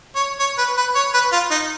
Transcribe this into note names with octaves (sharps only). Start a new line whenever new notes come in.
C#5
C#5
B4
B4
C#5
B4
F4
D#4